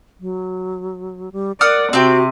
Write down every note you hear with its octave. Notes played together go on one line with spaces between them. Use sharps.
F#3
G3
A#4 D5 F#5 D#6 F6
C3 C4 F#4 G5